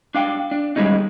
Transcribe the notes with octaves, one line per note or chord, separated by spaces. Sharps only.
D4 F5 G5
D4
D#2 A#2 G3 G#3 C#4 D#4